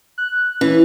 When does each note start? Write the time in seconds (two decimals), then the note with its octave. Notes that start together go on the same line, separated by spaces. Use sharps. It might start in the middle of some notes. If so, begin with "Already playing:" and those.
0.18 F#6
0.61 E3 C#4